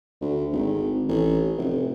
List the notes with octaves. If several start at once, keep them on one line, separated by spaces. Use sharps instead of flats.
D2
G#1
A1
F1